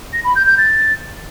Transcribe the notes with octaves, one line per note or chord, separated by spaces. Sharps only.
A#6
B5
G6
G6
A6